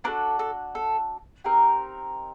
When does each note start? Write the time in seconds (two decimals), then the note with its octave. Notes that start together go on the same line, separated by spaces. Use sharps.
0.04 D4 F#4 A4 A#4
0.39 A4
0.75 A4
1.44 C4 D#4 G4 A#4